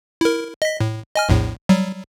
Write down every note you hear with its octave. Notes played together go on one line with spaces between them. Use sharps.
E4 A#4
D#5 B6
A2
D#5 G#5 F6
A#1 E2 A2
F#3 G3